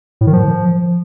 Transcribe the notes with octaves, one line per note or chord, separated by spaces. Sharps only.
A2
D#3
F3